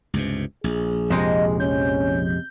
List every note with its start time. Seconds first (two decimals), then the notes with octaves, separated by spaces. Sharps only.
0.14 C#2 G2 C3
0.64 A#1 G#4
1.10 F2 C3 G#3 D#5
1.60 C#4 G6